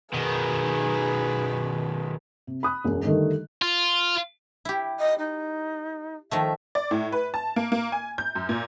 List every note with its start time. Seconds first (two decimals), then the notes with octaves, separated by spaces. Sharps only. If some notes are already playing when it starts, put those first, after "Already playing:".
0.14 B2 D#3 G#4 B4
2.47 C3
2.63 B5 D#6 F#6
2.85 E1 F#2
3.04 D3 D#3 G3 A3 D#4
3.62 F4
4.65 E4 G4
4.99 D#5
5.19 D#4
6.31 D#3 F3 A3 E5
6.75 D5
6.91 A2
7.12 B4
7.34 A5
7.56 A#3
7.72 A#3
7.92 G#5
8.18 G6
8.35 F#2
8.49 A#2